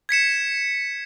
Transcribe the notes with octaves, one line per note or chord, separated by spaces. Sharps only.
G#6 B6 C#7 E7